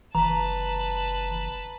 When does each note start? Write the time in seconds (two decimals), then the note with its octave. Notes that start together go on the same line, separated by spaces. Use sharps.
0.15 F#1 E3 B4 A5 A#5